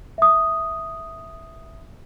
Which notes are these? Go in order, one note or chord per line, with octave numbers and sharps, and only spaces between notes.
E5 D#6